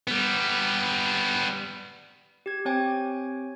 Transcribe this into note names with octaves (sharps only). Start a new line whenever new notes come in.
G3 B3
G4 G#6
C4 G4 C#5 G5 G#5 G#6